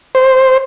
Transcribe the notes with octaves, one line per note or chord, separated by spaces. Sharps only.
C5